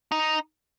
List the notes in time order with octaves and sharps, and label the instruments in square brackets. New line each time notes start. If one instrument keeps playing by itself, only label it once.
[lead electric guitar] D#4